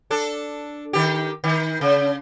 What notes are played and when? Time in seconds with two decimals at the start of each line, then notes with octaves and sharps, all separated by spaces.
0.11 D4 A4
0.93 D#3 G4
1.44 D#3
1.81 C#3